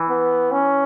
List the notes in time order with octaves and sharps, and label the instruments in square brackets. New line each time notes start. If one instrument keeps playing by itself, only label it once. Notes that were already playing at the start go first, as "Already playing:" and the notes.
Already playing: [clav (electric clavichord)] E3
[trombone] B3
C#4